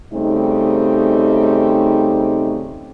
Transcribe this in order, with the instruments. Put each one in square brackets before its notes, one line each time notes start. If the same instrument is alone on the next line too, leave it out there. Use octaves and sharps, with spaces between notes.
[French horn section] C#3 G3 A3 C4 D#4